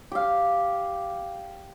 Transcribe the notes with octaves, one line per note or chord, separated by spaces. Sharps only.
G4 F5